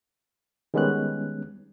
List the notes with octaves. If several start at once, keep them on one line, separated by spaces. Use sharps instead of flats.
D#3 G3 G#3 B3 C#4 F#6